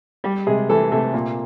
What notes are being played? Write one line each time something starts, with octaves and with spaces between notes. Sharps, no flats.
G3 G4
C3 G#3 G#4
E3 A3 A4
C3 A3 A4
A#2